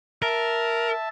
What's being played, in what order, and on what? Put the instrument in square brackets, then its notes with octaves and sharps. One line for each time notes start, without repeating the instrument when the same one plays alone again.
[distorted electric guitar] A#4 [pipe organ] E5 A5